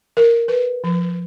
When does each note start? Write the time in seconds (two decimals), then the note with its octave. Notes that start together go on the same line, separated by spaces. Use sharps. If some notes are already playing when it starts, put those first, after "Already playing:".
0.17 A#4
0.48 B4
0.84 F3